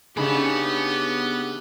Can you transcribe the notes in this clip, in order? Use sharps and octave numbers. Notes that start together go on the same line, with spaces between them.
C#3 A3 B3 D4 D#4 G4 G#4 B5